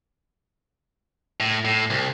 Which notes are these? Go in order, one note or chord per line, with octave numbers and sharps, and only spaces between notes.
A2
A2
C2